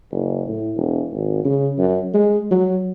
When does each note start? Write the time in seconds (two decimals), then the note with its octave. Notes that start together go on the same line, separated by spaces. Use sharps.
0.11 F#1
0.47 A2
0.77 E1
1.13 G#1
1.45 C#3
1.78 F#2
2.14 G#3
2.51 F#3